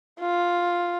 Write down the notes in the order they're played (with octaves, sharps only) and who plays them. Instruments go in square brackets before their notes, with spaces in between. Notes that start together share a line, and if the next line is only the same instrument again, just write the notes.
[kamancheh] F4